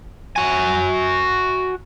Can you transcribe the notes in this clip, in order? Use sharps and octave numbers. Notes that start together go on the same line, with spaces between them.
F#4 G#5